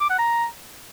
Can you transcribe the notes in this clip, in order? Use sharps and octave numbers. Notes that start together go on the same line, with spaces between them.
D6
F#5
A#5